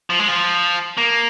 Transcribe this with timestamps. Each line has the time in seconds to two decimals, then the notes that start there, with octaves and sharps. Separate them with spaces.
0.10 F3
0.19 G#3
0.28 F3
0.98 A#3